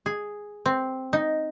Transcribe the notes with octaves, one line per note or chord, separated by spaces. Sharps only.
G#4
C4
D#4